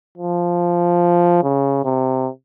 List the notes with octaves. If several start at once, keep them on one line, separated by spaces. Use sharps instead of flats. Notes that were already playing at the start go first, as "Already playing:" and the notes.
F3
C#3
C3